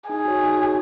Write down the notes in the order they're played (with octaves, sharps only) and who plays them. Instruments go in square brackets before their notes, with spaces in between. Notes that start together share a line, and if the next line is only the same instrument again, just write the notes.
[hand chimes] D#4 [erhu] G#4
[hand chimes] F#4 C#5
D#4
F#4 C#5